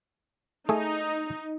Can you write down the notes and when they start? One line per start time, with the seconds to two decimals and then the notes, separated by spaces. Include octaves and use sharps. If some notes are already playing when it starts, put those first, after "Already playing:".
0.69 A3 D#4 G#4